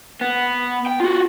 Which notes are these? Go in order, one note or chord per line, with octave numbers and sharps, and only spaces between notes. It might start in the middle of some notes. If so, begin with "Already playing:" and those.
B3
G5
F4 F#4